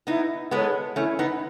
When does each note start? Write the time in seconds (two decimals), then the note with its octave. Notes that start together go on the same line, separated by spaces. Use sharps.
0.07 B3 D#4 E4
0.51 G#3 B3 A4 C#5
0.96 A3 C#4 E4
1.19 B3 D#4